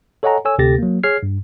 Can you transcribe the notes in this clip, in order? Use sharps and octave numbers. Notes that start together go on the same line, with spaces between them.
A4 C#5 D#5 F#5 G#5 A#5
A4 C#5 G#5 E6
D2 C3 G4 A4 A6 A#6
F#3 A#3
G#4 C#5 F6 G#6 C7
G2